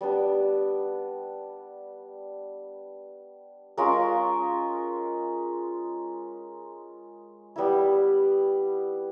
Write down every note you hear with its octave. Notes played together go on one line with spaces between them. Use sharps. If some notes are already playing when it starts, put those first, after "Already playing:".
G3 B3 D4
G#3 C#4 F4 A#4
G3 B3 E4